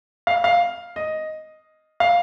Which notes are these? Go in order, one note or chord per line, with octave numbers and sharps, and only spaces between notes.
F5
F5
D#5
F5